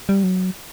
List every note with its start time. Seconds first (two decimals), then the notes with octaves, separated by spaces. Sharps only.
0.09 G3
0.23 F#3